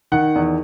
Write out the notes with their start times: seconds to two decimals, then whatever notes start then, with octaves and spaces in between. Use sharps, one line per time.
0.12 D#3 F#5
0.36 E2